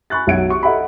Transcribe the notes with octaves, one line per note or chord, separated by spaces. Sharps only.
G#5 B5 C#6 F#6 A6
B1 F#3 E5 F#5 G#6 D7
C#6
A4 D#5 E5 F#5 A#5 B5